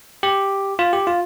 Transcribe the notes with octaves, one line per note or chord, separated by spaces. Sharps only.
G4
F4
G4
F4